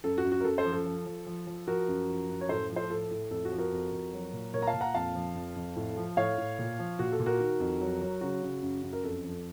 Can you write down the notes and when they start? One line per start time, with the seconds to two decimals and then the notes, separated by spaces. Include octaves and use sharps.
0.04 F#2 A4
0.18 F#4
0.24 F#2
0.32 F#4
0.41 A#4
0.45 F#2 A4
0.58 A4 C5
0.65 F3
0.72 A4
0.86 F3
1.06 F3
1.26 F3
1.47 F3
1.67 F3 F#4 A#4
1.88 F#2
2.08 F3
2.29 F#2
2.41 C#5
2.49 A2 A4 C5
2.70 F3
2.76 A4 C5
2.90 A2 A4
3.11 A2
3.31 F2 A4
3.45 F#4
3.52 F3
3.58 F#4 A#4
3.72 F2
3.92 F2
4.13 F#3
4.33 A#2
4.54 A#2 A#4 C#5
4.62 A#5
4.67 F5 A5
4.74 A#2
4.81 F#5 A#5
4.94 F2 F5 A5
5.15 F3
5.35 F2
5.56 F2
5.76 A2
5.97 F3
6.17 A2 C#5 F5
6.38 A2
6.59 A#2
6.79 F3
6.99 A#2 F#4
7.12 A4
7.20 A#2
7.26 F#4 A#4
7.40 D#3
7.60 F2
7.81 F#3
8.01 F#3
8.21 C#3 F#4
8.43 C#3
8.62 F#2
8.83 F#2
8.93 A#4
9.04 F2 A4
9.24 F3